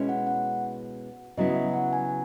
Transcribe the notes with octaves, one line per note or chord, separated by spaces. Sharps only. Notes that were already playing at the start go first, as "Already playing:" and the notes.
Already playing: B2 G#3 C#4 E4
F#5
F#5
C#3 F#3 B3 E4 D#5
E5
F#5
G#5